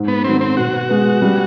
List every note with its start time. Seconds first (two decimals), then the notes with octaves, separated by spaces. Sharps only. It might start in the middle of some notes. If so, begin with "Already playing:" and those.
Already playing: G#2
0.08 B3
0.24 D#3 F#3 A3 C4
0.41 C4
0.57 B2 F#4
0.89 G#3 B3
1.22 G3